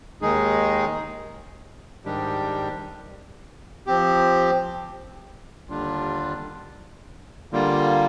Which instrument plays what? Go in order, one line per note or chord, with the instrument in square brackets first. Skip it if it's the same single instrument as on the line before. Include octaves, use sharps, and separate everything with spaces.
[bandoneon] D#2 D#3 G#3 D#4 G#4
G#2 D#3 G3 D4 G4
F3 C4 G4
D#2 D3 G3 D4 F4
D3 G3 A#3 F4